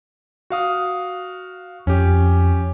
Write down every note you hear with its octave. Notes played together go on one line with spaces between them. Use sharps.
F#4 F5 D#6
F2 C#4 G4